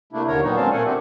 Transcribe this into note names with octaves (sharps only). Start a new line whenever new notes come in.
C3 A3 A#3 D4 E4
D#2 D3 A#4 C#5 A#5
A#2 D#3 F#3 B3 D#4 F#4
A#2 G#3 C4 C#4 F5 A5
A#2 A3 A4 A#4 F#5 G#5
D#3 C4 D4 G4